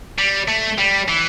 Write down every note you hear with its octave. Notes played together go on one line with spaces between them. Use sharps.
G3
A3
G3
E3